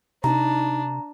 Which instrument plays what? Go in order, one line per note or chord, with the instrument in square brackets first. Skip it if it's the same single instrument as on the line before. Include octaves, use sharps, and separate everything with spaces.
[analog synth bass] C3 [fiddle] D4 [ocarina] D#4 [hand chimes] A#5